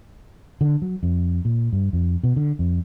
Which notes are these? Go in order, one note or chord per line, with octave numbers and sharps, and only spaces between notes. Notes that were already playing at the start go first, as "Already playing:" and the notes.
D3
F#3
F2
A#2
G2
F2
B2
D3
F2